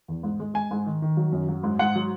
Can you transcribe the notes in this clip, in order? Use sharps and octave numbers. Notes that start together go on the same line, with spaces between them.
E2
G#2
G#3
G#3 G#5
G#2
D#3
D#3
F#3
F#2
F#3
G#2
G#2 F#5
F#3